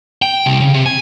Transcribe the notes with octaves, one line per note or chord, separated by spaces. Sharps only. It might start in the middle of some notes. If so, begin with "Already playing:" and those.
G5
C2
C#3
C3
G#5